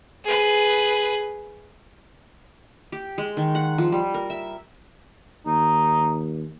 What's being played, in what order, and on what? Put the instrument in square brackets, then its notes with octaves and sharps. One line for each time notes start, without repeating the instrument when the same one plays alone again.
[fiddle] G#4 B4
[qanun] G4
G#3
D#3
F#5
F3
G3
A#4
E5
[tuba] D#2 [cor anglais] D#4